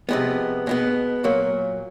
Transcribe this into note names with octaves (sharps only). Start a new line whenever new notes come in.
C3 F3 G#3 B3
B2 G#3 B3
A#2 F#3 A#3